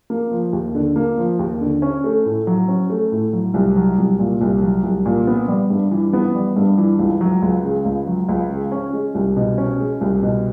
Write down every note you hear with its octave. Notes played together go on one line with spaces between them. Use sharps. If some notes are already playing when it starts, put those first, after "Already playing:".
A#3
F3
D#2
D3
A#3
F3
D#2
D3
C#4
A3
A2
F#3
C#4
A3
A2
F#3
C2
F#3
C2
A#2
C2
F#3
C2
A#2
B3
G3
G2
E3
B3
G3
G2
E3
C#2
F#3
C#2
C#3
C#2
F#3
C#2
C#3
C#4
G#3
C2
B2
C#4
G#3
C2
B2